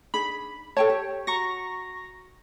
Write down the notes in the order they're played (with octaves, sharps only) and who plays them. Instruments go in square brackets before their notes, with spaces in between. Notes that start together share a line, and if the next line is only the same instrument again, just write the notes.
[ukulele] D4 D#4 G#4 [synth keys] B5
[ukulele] A4 G5 A5 [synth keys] C#5
[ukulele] G4
[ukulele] F#4 [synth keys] A#5 C#6 A#6